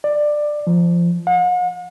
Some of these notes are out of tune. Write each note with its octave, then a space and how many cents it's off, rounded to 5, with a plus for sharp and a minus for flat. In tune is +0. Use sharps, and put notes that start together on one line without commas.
D5 +15
F3 -15
F#5 -45